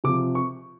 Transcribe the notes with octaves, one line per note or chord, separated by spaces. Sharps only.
C3 F3 D6
C#6